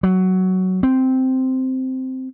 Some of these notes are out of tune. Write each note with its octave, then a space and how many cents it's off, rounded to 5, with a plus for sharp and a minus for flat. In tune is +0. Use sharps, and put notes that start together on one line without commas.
F#3 +10
C4 -5